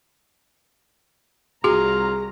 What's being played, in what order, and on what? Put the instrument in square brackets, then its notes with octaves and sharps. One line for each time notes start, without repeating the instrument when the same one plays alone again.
[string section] C2 A#5 [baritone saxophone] F4 [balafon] F#4 [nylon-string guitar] G#4